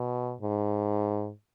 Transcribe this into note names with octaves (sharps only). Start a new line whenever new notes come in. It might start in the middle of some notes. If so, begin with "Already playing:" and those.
Already playing: B2
G#2